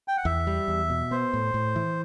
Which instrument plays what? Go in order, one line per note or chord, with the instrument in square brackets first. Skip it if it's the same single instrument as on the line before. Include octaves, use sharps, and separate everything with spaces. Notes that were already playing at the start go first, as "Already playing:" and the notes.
[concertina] G5
F#5
[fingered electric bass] E2 [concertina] E5
[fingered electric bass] G3
E2
B2
[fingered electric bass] B3 [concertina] C5
[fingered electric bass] A2
A2
E3